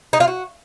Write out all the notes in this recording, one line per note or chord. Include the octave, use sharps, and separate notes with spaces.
D#4
F4
F#4